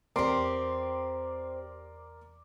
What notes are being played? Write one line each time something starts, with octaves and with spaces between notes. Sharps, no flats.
E2 C4 G4 A#4 D5 C6 D6